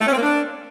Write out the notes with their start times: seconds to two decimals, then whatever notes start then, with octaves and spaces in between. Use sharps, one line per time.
0.01 A3
0.06 C#4
0.12 C4
0.17 A#3
0.23 D4